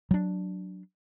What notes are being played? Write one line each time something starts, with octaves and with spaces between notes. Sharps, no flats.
F#3 D4